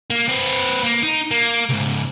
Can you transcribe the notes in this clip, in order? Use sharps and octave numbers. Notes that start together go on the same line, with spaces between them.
A#3
C4 B4
A#3
D#4
A#3
C#2 G#2